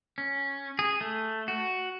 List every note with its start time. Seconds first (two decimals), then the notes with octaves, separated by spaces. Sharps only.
0.18 C#4
0.79 G#4
1.01 A3
1.48 F#4